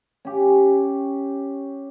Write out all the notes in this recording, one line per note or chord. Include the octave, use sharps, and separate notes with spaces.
C#4 G4